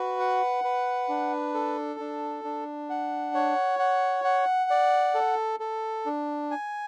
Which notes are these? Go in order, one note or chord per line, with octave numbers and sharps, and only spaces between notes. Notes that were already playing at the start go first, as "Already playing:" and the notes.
Already playing: F#4 B4
F#5
B4
D4
A4
D4
D4
F#5
C#5
F#5
F#5
D5
A4
A4
D4
G#5